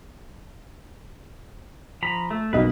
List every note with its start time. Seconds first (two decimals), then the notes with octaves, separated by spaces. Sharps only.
2.03 F3 A#5 B5
2.31 A3
2.53 B1 A#3 B4 D#5